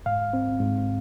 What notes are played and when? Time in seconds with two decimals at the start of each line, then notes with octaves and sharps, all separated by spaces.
0.06 G#2 F5
0.33 C4
0.60 G#2